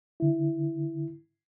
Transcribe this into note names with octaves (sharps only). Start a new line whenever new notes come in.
D3 E4